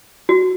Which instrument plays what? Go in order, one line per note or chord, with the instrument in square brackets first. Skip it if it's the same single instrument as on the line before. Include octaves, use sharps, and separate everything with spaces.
[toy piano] F#4